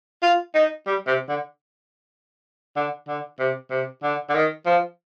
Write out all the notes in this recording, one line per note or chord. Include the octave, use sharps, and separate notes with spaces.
F4
D#4
G3
C3
D3
D3
D3
C3
C3
D3
D3
D#3
F3